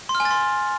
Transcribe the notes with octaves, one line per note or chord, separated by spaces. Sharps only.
C6
F6
G#5
A6
C6